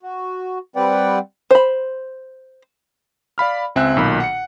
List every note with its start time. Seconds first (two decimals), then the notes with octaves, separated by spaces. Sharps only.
0.03 F#4
0.76 G3 C4 B4 D5 F#5 G5
1.51 C5 B5
3.38 D5 F5 B5 F6
3.76 C#2 C4 E5 G#5 F#6
3.97 B1 A#2 D#3 B5
4.20 F#5 C#7